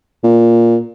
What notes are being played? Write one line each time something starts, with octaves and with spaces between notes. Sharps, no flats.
A#2